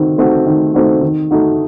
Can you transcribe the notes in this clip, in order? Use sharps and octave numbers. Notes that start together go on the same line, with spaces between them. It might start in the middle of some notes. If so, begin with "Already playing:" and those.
Already playing: D#3 A3 C4 F#4
A3 C4 D#4 F#4
D#3
A3 C4 D#4 F#4
D#3
A3 D#4 F#4